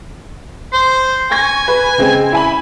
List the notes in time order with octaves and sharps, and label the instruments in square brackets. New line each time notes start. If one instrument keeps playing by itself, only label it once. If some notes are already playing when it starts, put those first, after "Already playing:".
[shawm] C5
[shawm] G#5 [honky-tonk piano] C#6 G#6 A#6
[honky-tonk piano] B4
C#3 G#3 C4
E4 G#5 B5